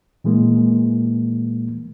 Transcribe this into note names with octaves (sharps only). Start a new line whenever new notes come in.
A#2 E3 G#3 A#3